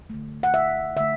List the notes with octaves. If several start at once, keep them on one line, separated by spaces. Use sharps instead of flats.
D3 A3
F#5
E5
D3 A3 E5